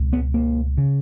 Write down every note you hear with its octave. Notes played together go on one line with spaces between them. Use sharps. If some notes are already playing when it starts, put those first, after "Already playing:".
Already playing: C#2 B2
B3
A#3
C#3